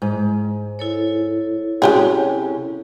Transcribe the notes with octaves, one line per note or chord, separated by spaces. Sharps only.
G#2
E4 A4 C#5
C3 F#3 C#4 G4 G#4